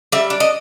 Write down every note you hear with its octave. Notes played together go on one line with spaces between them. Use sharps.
G3 E5
D4
D#5